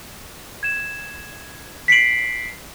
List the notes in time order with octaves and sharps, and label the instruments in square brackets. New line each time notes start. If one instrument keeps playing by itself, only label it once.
[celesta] G#6 E7
B6 C7 D7 F#7